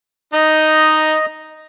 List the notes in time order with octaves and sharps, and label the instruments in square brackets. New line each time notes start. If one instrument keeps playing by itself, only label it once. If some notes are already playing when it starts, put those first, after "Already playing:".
[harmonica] D#4 [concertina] D#5